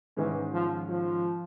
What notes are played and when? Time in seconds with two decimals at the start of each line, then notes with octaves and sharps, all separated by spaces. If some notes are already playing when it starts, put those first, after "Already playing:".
0.17 G#2 D#3 E3 G#3 C#4
0.53 F3
0.90 F3